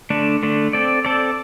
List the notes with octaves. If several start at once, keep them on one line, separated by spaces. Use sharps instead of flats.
D3 A3 D4
D3 A3 D4
C4 A4 D5
C4 A4 D5